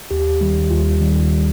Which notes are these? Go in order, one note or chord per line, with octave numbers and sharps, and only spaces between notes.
D#2 G4
D#3 G3
D#2 F4
D#3 G3